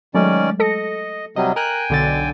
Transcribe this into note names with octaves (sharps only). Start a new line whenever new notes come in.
D#3 F#3 G#3 A3 C#4 D5
A4 D#5 A#6 C#7
C3 F#3 G3 D#5
A#4 G5 G#5 F#6
B1 D3 A6